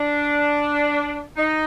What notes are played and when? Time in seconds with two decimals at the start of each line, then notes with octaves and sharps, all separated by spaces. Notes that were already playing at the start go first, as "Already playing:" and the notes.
Already playing: D4
1.37 D#4